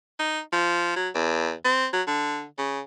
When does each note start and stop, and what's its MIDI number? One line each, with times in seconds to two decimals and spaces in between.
0.19 0.39 63
0.52 0.92 53
0.96 1.09 54
1.15 1.52 40
1.65 1.87 60
1.93 2.02 54
2.07 2.45 50
2.58 2.80 49